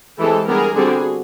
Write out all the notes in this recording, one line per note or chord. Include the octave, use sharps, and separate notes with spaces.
E3 G#3 C4 G4 A4
D3 G3 B3 G#4 A#4
D3 G3 C4 F#4 G#4